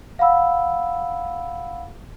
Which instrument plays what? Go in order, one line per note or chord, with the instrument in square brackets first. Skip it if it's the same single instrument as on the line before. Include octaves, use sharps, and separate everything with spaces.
[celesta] F5 F#5 B5 E6